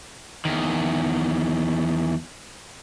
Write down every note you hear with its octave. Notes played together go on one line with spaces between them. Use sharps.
E2 D#3